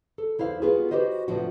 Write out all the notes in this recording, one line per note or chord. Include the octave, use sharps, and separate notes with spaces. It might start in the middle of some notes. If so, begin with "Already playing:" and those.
A4
E2 E4 C5 F5
B3 F4 F#4 G#4
F#4 G4 B4 C5 D#5
A2 C3 F3 B3 D4 F#4